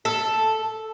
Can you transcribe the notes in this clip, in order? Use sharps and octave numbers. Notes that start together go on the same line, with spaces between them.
A4